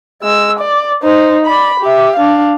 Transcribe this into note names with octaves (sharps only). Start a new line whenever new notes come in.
G#3 E6
D5
D#4 C5
D5 B5
G4 E5
D4 F5